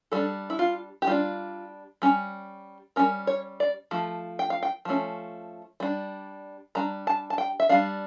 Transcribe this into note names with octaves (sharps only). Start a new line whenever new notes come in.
G3 D4 A4
E4
F4
G4
G3 D4 F4
G3 C#4
G3 C#4 A#4
C#5
D5
F3 A3
G5
F5
G5
F3 A3 C#4
G3 D4
G3 D4 A#5
A5
A5
G5
E5
G3 D4 F5